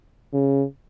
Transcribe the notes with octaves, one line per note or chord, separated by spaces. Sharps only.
C#3